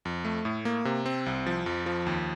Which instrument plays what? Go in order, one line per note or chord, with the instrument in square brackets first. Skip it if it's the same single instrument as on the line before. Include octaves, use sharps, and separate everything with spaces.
[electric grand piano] F2
A3
A2
A#3
C3
C4
C2
F3
F2
F3
D#2